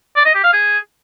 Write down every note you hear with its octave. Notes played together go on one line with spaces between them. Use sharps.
D5
D#5
G4
F5
G#4